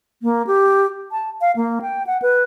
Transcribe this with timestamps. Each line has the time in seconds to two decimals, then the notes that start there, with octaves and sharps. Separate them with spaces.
0.22 A#3
0.47 G4
1.12 A5
1.41 F5
1.56 A#3
1.82 G5
2.07 F#5
2.22 B4